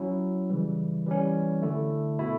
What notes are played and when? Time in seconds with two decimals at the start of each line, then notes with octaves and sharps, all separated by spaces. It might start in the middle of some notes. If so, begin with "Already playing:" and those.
Already playing: F#3 C#4 E4
0.49 C#3 E3 G3
1.06 E3 G3 C#4
1.62 D3 A3 E4
2.19 B2 A3 E4